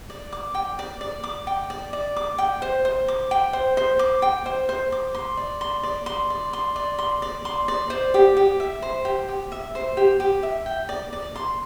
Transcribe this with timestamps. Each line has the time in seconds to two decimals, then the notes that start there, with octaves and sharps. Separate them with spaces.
0.10 D5
0.33 D6
0.55 G5
0.79 D5
1.01 D5
1.24 D6
1.47 G5
1.70 D5
1.93 D5
2.16 D6
2.38 G5
2.62 C5
2.85 C5
3.08 D6
3.31 G5
3.53 C5
3.77 C5
3.99 D6
4.22 G5
4.46 C5
4.69 C5
4.92 D6
5.15 C6
5.37 D5
5.61 C6
5.83 D5
6.06 C6
6.30 D5
6.53 C6
6.76 D5
6.98 C6
7.22 D5
7.45 C6
7.68 D5
7.90 C5
8.14 G4
8.37 G4
8.60 E5
8.82 C5
9.05 G4
9.29 G4
9.52 E5
9.75 C5
9.97 G4
10.20 G4
10.43 E5
10.66 G5
10.89 D5
11.13 D5
11.36 C6